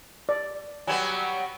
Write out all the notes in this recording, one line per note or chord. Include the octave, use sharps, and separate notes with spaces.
D5
F#3 G3 B3 G#5